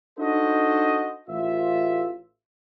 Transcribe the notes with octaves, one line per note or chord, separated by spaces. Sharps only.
D4 D#4 F#4 A4 C5 D#5
A1 F4 E5